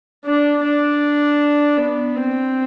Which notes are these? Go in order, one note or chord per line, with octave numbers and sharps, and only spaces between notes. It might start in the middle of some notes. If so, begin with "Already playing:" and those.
D4
D4
B3
C4